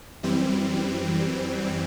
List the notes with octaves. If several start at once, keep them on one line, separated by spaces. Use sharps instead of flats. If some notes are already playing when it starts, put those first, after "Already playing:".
F#2 E3 G3 C4